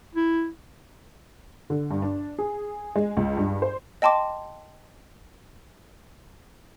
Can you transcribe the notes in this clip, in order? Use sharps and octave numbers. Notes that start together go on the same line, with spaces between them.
E4
D3
G2
D4
G#4
G#3
C#2
G2
C5
D#5 G5 A5 C6 D6